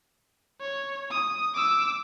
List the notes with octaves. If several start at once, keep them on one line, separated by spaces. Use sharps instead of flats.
C#5
D#6
D6 E6